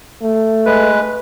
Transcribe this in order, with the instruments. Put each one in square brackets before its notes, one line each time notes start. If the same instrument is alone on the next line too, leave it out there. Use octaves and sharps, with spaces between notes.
[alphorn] A3
[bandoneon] G#3 B4